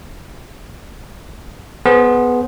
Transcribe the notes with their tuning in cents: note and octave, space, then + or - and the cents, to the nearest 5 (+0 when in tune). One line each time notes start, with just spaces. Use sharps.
B3 +0 G#4 +25 C5 +0